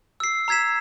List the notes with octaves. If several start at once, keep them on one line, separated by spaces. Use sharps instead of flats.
E6 C7
A#5 E6 G#6 B6 E7